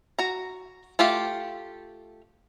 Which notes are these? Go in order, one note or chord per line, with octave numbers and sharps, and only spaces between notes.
F#4 A#5
A3 F4 G4 F5